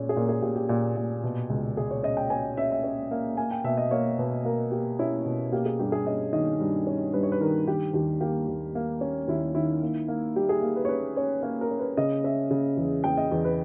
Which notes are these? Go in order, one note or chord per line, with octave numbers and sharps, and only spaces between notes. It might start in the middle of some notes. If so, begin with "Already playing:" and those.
Already playing: A#2 G#3 C#4
G#4
A#2 A#4
G#4
A#2 G4
G4
A#2
A#2
B2
C#2
C#2 G#4
C#5
C#4 D#5
G5
C#4 G#5
C#4 E5
E5
C#4
A#3
A#3 G#5
G5
B2 E5
D#5
A#3 C#5
B2 B4
A#3 A#4
A#3 G4
C#4 E4
B2
A#3 G4
G#4
G2 G4
G#4
C#4 D#5
D#3 D#5
G2
C#4
G2 B4
C#5
B4
D#3 A#4
D#3 G4
D#2 G4
A#3 G4
D#2
A#3
C#4
D#2 E4
D#3 E4
A#3
A#3
G3 G4
G#4
A#3
B4
C#5
C#4 B4
C#4 C#5
A#3 C#5
A#4
C#4
B4
C#3 D#5
C#4 E5
C#3
E2
E2 G5
D#5
E2
B4